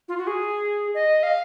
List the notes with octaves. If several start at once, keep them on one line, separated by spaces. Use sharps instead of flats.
F4
F#4
G#4
D#5
F5